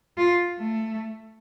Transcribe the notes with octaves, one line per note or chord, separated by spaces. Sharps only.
F4
A3